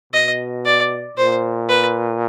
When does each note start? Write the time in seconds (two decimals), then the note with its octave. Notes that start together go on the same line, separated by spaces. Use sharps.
0.13 B2 D#5
0.66 D5
1.17 A#2 C5
1.69 B4